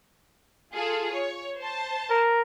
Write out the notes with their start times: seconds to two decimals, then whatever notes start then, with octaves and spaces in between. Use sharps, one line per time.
0.74 F4 G#4 A4
1.11 C#5
1.58 C5 A5
2.10 A#4